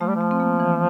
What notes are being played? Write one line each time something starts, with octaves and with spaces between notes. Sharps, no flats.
F3 A3
G3
F3
A3
C4
A#3
E3